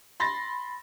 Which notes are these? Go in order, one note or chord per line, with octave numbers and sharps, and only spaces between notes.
B5 C6 A6 A#6